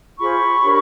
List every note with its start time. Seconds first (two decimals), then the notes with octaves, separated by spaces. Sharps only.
0.18 F4 G#4 C5 B5 C#6
0.63 D4 G4 A#4 C#5